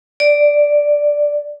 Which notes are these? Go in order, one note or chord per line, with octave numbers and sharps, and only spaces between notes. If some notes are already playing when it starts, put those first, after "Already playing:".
D5